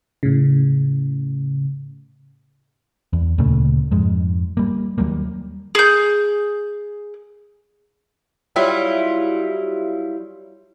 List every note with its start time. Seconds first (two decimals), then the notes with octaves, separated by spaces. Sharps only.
0.23 A2 C#3
3.13 E2
3.38 D2 A#2 C#3 A3
3.91 F2 G#2 G#3
4.57 G3 A#3
4.98 D#2 F#3 G3 A#3
5.75 G#4 G6
8.56 F#3 G3 E4 F4